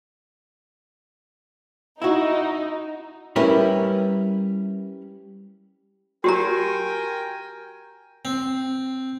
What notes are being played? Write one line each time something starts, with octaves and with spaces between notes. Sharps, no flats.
D#4 E4 F#4
G3 C#4 E4 A#4 B4
F#4 G4 A#4 G5 G#5 A#5
C4